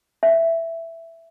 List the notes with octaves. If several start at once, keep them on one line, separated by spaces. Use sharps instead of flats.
E5